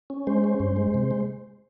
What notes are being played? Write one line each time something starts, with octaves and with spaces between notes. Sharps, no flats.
C#4
G#3 C5
C#4
G2
G#3
C3
G#3